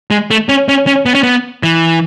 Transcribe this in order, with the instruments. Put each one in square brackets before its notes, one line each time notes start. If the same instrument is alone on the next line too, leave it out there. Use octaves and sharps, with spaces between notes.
[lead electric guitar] G#3
A3
C#4
C#4
C#4
B3
C#4
B3
E3